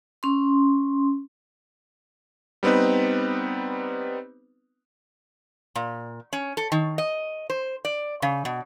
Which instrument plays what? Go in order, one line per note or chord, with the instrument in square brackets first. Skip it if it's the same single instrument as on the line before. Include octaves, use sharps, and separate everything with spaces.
[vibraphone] C#4 C6
[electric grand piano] G3 B3 C4 D#4 B4
[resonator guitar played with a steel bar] A#2
C#4
A4
D#3
D#5
C5
D5
C#3
B2